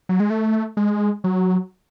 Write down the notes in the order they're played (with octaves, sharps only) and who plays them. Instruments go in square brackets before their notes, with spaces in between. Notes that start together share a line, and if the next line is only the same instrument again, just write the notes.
[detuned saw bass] F#3
G#3
A3
G#3
F#3